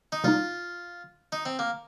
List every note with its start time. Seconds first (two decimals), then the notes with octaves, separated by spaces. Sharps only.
0.12 D#4
0.24 C3 G3 A#3 D#4 F4
1.32 D#4
1.45 C4
1.59 A#3